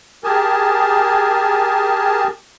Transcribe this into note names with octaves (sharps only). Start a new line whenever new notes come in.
G4 G#4 A#4 G#5 A5